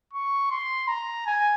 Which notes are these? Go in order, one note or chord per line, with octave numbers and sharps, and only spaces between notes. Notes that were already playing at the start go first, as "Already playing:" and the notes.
C#6
C6
A#5
G#5